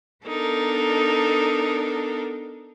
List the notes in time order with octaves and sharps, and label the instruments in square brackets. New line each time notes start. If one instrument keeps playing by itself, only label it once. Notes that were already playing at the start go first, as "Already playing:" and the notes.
[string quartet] B3 D4 D#4 A4 A#4